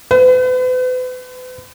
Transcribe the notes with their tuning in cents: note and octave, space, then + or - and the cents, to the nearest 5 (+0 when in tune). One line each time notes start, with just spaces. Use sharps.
B4 +40